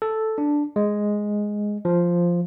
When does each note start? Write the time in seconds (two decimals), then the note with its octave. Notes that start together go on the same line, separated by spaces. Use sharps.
0.02 A4
0.38 D4
0.76 G#3
1.85 F3